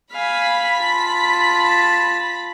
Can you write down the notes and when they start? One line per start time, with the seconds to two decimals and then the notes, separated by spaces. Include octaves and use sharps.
0.12 F5 G#5 B5 B6
0.80 F4 A5